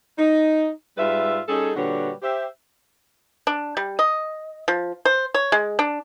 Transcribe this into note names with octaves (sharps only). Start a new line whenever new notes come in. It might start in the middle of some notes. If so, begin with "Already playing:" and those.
D#4
G#2 G3 F4 B4 E5
G3 C#4 D#4 G#4 A4
A#2 D3 G3 F#4 B4 C#5
G4 C5 E5
D4
G3
D#5
F3
C5
C#5
G#3
D4